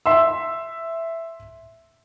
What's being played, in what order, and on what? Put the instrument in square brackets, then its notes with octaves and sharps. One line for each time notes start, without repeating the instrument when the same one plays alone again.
[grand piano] E5 C6 E6